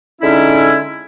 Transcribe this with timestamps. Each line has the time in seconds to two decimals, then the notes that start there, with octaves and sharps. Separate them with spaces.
0.21 D3 G#3 C#4 D#4 E4